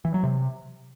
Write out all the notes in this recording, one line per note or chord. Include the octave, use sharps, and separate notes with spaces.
E3
F#3
C3